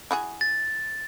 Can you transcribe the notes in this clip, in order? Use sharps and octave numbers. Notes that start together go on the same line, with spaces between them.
E4 F#4 G#4
A6